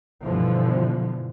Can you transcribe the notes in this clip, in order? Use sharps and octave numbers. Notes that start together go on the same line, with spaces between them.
G2 B2 D3 E3 F3